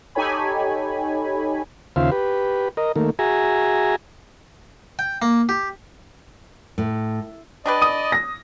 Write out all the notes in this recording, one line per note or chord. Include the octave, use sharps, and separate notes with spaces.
D#4 G4 A4 C#5 G#5 B5
D#2 C#3 F4 C5 E5 F5
G4 B4
A#4 D#5
D#3 A3 A#3
F#4 G#4 E5 G#5 A#5
G5
A#3
G4
A2
D4 G4 B4 D5 D#5
D#6 D#7
A#6